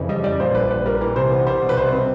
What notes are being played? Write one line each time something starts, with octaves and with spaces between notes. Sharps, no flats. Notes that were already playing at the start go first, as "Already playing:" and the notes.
Already playing: F2 C#3 E3
G3 D#5
G3 D5
A#2 C5
A#1 B4
A#1 B4
G3 A#4
E3
C3 C5
B3
G3 C5
B2
B4
C2 C5
C4